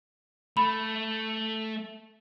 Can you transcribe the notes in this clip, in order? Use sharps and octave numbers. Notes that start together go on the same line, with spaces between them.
A3 B5